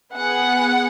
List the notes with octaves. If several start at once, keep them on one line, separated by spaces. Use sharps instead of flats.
B3 G#4 F#5